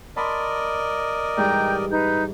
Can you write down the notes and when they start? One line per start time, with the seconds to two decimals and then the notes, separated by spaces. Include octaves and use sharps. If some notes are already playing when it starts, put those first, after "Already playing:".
0.17 A#4 D5 D#5 A5 B5 C6
1.37 G#2 E3 G3 G5 A#5 G6
1.91 D#4 B4 G6